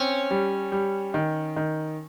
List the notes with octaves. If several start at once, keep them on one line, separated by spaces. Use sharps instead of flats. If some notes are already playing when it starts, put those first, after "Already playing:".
Already playing: C4 C#4
G3
G3
D#3
D#3